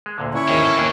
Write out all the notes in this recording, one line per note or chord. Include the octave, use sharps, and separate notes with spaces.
G#3
D2 A#2 D3
C#4 E4 C#5
G#1 D#2 D#3 A#5
A2 A#3 A4
D#2 E3 A#3 D4 A#4